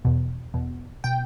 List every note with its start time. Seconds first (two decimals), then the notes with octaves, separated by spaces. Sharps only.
0.05 E2 B2
0.54 E2 B2
1.04 B2 G5